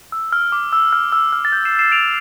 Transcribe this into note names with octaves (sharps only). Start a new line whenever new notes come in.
E6
F6
D6
E6
F6
E6
F6
A6
G6
C7 E7
C7 E7
D7 F7